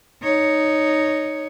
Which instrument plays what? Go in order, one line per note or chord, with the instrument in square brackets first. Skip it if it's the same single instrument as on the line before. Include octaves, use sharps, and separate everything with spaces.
[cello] D#4 C#5